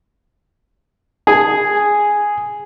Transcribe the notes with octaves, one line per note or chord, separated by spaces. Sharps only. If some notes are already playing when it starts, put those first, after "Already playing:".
G#4